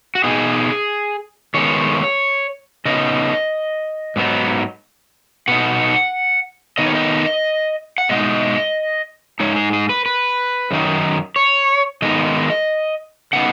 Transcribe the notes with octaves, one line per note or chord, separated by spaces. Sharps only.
F#4
B2 B3 D#4 G#4
D#3 G#3 B3 C#5
C#3 B3 D#4 D#5
G#2 F#3 B3 D#4
B2 B3 D#4 F#5
D#3 B3 D#4 D#5
C#5
D#5
F#5
B2 G#3 D#4 D#5
G#2 G#3 D#4 C#5
G#4
G#4
B4
B4
F#2 D#3 F#3 D#4
C#5
D#3 G#3 B3 D#4 D#5
C#3 B3 D#4 F#5